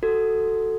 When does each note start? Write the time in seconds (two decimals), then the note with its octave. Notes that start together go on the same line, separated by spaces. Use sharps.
0.03 F#4 A4